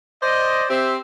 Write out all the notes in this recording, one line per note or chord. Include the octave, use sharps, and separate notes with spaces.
C5 D5 D#5
C4 G4 E5